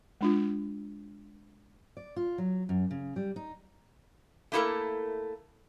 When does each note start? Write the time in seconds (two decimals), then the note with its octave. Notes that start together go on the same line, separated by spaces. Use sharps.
0.21 G#3 D4 F4
1.97 D5
2.16 F4
2.38 F#3
2.69 F#2
2.91 C#3
3.16 G3
3.36 D#4
4.52 A3 A#3 E4 G4 A4 A#4